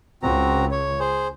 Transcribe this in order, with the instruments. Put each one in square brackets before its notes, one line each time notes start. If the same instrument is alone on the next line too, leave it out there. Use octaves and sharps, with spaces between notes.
[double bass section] C#2 [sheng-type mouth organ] C4 F#4 A#5
[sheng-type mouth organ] C#5
G#4 C5